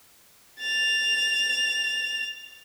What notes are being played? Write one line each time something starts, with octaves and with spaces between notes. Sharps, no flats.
A6 F7